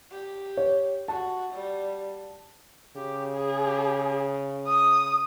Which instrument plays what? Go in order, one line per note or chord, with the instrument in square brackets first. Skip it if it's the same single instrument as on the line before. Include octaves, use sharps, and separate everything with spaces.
[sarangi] G4
[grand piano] C#5
[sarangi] F#4 [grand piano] A5
[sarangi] G3
[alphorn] C#3 [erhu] G4
[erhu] G#4
D#6